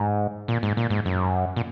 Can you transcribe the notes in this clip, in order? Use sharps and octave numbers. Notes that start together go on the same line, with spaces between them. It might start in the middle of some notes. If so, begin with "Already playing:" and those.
Already playing: G#2
A#2
G#2
A#2
G#2
F#2
A#2